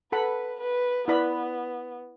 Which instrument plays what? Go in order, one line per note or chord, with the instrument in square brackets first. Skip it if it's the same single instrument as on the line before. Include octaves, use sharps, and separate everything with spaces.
[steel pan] A4 F#5 B5 [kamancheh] B4
[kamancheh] B4
[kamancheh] B3 [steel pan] E4 B4 D5 B5